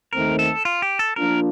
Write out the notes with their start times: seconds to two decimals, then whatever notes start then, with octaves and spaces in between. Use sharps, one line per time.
0.13 D#2 D#3 A3 C4 A#4
0.39 A4
0.65 F4
0.82 G4
0.99 A4
1.16 F3 A#3 D4 F4 A#4